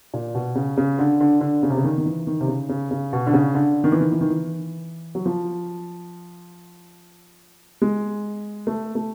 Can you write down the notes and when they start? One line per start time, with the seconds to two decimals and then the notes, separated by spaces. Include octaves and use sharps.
0.14 A#2
0.35 B2
0.55 C#3
0.77 C#3
0.99 D3
1.21 D3
1.41 D3
1.63 C#3
1.70 C3
1.77 C#3
1.84 D#3
1.98 D#3
2.05 E3
2.27 D#3
2.40 C3
2.48 C#3
2.69 C#3
2.91 C#3
3.13 B2
3.27 D3
3.33 C#3
3.55 D3
3.84 D#3
3.92 E3
4.01 D#3
4.12 E3
4.21 D#3
4.30 E3
5.15 F#3
5.26 F3
7.82 G#3
8.67 A3
8.95 A3